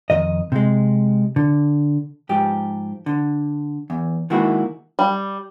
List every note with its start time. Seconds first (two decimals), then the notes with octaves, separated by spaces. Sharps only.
0.10 F2 D#3 D#5
0.52 C3 G#3
1.36 D3
2.29 G#2 F3 G4
3.06 D3
3.90 E2
4.30 D#3 G#3 A#3 E4 F#4
4.99 G3